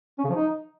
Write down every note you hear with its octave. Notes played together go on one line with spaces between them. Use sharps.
C#4
C#3
F3
D#4